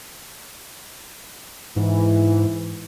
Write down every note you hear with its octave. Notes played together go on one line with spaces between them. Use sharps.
G#2 E3